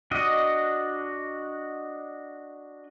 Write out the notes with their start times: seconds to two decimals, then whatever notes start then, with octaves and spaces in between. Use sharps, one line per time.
0.11 D4 F#4 D#5